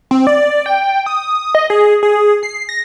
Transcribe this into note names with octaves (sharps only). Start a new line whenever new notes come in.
C4
D5
G5
D#6
D#5
G#4
G#4
C7
A#6